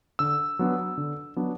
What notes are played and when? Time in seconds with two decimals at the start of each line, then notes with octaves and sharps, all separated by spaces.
0.19 D3 E6
0.59 F#3 B3 D4
0.97 D3
1.36 F#3 B3 D4